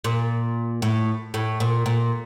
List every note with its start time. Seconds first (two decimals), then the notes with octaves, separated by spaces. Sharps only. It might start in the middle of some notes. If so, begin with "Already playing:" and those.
0.04 A#2
0.82 A2
1.34 A2
1.60 A#2
1.86 A#2